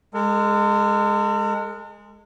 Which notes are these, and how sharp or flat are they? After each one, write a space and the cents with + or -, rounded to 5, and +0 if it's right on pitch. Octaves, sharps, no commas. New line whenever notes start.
G#3 -5 A4 +45